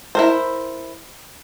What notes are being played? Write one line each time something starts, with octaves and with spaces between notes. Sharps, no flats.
E4 A#4 C5